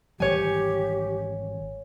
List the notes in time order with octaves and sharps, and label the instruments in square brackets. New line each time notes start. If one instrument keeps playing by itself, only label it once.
[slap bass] G#1 E3 G3 [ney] G4 [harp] C#5 G#5